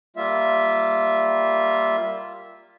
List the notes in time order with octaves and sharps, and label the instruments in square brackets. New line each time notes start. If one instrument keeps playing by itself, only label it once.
[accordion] G3 A#3 F4 E5